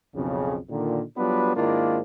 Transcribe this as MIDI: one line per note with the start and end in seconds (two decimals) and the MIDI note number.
0.16 0.58 35
0.16 0.58 41
0.16 0.58 49
0.69 1.02 46
0.69 1.02 50
0.69 1.02 51
1.17 1.53 54
1.17 1.53 55
1.17 1.53 59
1.17 1.53 62
1.17 1.53 65
1.17 1.53 71
1.56 2.01 44
1.56 2.01 51
1.56 2.01 58
1.56 2.01 62
1.56 2.01 64
1.56 2.01 65